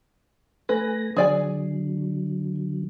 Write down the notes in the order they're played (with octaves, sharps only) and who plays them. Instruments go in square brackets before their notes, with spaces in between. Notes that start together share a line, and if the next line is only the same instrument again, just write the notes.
[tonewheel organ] A3 G#5 A#6 [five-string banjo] B4
[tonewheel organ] D3 F#3 [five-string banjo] G#4 D5 G#5